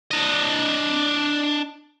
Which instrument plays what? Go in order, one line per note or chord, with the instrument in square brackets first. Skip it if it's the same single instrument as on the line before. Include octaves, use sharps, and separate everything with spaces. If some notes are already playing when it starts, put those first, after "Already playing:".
[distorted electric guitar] D4 D#5